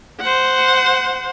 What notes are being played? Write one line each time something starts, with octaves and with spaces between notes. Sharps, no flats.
C5 F#5